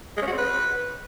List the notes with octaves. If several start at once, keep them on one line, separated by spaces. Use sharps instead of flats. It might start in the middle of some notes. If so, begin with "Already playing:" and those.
G#3
C#4
F#4
C4
B4